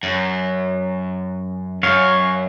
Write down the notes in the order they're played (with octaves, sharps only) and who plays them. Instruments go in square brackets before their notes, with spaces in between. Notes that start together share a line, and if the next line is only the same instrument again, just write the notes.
[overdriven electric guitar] F#2
[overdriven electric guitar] F#2 [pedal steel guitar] C#5 F5